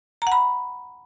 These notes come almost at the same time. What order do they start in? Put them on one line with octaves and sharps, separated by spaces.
A#5 F#5 B5